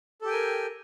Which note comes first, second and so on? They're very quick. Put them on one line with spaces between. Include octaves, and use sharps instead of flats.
A4 G4 G5 G#5 A#4